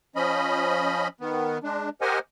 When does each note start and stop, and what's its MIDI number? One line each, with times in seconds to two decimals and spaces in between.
0.16 1.08 53
0.16 1.08 61
0.16 1.08 75
0.16 1.08 83
1.21 1.58 51
1.21 1.58 59
1.64 1.89 56
1.64 1.89 62
2.01 2.19 67
2.01 2.19 70
2.01 2.19 72
2.01 2.19 75
2.01 2.19 78
2.01 2.19 80